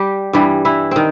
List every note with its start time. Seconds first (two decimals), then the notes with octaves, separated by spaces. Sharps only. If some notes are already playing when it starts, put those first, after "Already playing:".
Already playing: G3 G4
0.33 G2 E3 G3
0.65 E3 E4
0.91 D#3 C4